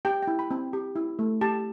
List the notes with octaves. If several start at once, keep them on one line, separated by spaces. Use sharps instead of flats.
G4 G5
G5
E4
B5
C4
G4
E4
A3
G4 A5